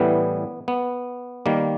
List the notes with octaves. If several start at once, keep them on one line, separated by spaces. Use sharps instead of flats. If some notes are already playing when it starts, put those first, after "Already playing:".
Already playing: A2 E3 G3 B3
B3
D#3 G3 A#3